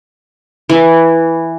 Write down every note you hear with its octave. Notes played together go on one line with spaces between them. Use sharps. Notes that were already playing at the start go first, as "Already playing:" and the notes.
E3